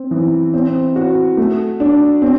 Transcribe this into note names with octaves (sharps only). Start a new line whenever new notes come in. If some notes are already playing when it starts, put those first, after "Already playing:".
Already playing: C4
E3
C4
F#4
A3
D4
C4